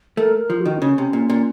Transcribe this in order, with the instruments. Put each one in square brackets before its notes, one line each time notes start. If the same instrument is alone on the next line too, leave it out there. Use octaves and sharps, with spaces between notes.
[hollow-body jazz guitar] A3 [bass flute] A#4
[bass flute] A#4
[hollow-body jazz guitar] F3
[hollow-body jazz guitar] D#3 [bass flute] F#4
[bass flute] C4
[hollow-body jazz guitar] C#3 [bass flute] C#4
[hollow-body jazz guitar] C3
A#2
A#2